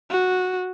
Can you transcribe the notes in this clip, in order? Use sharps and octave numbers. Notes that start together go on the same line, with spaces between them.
F#4